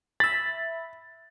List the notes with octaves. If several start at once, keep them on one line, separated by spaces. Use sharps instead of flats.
E5 B5 A6